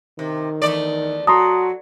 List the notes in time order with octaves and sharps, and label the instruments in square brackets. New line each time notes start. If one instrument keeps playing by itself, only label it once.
[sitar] C3 [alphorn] D#3
[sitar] E2 A3 D5
[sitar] F#3 [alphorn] F#4 [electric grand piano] A5 A#5 C6 [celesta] D#6